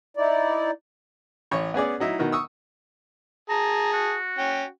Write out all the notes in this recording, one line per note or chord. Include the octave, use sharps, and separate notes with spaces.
D#4 E4 D5
A1 C#5 C#6
B3 C#4 G#4 D5
F#3 D#4 E4
B2 D#3
C#6 D#6 E6
G#4 A5 A#5
F#4
C#4 G5